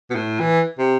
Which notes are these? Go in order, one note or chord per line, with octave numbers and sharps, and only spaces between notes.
B2
A2
E3
C3